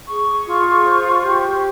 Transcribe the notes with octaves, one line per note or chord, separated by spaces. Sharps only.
G#4 C#6
F4
C5
G4